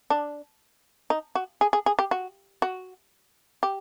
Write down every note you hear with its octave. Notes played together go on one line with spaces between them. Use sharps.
D4
D#4
F#4
G#4
G#4
G#4
G4
F#4
F#4
G4